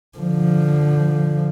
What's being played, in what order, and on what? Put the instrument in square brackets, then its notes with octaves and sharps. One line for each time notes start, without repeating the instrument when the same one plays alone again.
[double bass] D3 F3